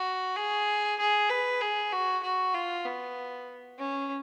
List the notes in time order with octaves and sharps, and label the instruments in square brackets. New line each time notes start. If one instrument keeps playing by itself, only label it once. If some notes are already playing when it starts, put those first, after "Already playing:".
Already playing: [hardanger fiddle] F#4
G#4
G#4
B4
G#4
F#4
F#4
F4
B3
C#4